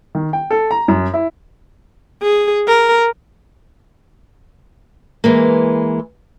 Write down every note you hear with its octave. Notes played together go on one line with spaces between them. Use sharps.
D#3
G5
A4
A#5
F#2
E4
G#4
A#4
E3 G#3 A#3